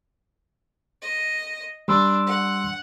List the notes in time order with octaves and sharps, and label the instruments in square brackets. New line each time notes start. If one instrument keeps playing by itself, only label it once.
[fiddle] D#5
[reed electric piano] G3 C6 E6 [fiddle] D4
[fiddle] F#5